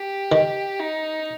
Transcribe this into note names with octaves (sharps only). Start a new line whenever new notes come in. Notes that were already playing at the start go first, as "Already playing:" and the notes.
Already playing: G4
D#3
D#4